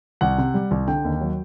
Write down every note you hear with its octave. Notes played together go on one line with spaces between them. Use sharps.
C2 F#5
C3
G3
C2
D3 G5
D#2
F#3